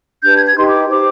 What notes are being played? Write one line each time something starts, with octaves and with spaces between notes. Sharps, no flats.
D4 G4 B4 G6
G#6
G#6
D#4 G4 B4 C6
D6
D#4 G4 C5 D6